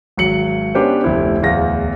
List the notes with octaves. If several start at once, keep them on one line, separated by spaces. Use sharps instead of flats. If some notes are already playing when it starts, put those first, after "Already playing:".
G#1 F#3 C#7 F#7
B3 C#4 D4 G4 B4 C5
F1 D2 E4 C5
D1 E2 F5 A#6